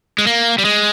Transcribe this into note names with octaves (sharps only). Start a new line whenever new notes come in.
G#3
A#3
G3
G#3